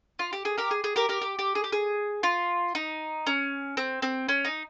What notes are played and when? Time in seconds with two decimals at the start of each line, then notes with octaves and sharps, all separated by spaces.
0.19 F4
0.33 G4
0.45 G#4
0.58 G4 A#4
0.71 G#4
0.84 G#4
0.96 G4 A#4
1.09 G4 A#4
1.22 G4
1.39 G4
1.55 G#4
1.64 G4
1.72 G#4
2.23 F4
2.75 D#4
3.27 C#4
3.77 C4
4.02 C4
4.29 C#4
4.45 D#4